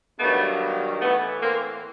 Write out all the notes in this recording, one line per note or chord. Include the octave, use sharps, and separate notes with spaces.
G2 D#3 F#3 A3 B3
A2 E3 A3 B3
A#3 C4